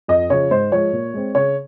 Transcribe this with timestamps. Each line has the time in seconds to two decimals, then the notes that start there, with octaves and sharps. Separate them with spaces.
0.08 F2 D#5
0.30 C#3 F3 C#5
0.51 G#2 C5
0.72 F3 G#3 C#5
0.93 A#2
1.14 G#3 C4
1.35 C#3 C#5